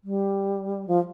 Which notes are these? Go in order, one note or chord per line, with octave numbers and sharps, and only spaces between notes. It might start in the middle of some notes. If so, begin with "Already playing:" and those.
G3
F3